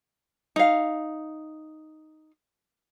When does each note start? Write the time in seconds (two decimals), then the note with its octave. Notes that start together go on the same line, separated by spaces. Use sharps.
0.56 D#4 F5